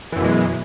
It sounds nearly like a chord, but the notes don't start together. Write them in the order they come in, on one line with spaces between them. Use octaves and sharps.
E3 F#2 B2 G#3